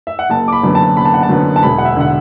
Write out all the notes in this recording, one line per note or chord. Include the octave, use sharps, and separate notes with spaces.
E5
F#5
F#1 A5
D6
B5
F#2 D3 F#3 B3
A5
F#1 B5
A5
F#5
A5
F#2 D3 F#3 B3
A5
E1 B5
F#5
E5
D3 F#5